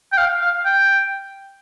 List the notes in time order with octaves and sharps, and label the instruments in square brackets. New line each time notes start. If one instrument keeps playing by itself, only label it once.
[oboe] G5
F5
F5
G5